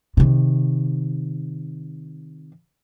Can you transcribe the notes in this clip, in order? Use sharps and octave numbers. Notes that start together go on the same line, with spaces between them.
C3 D#3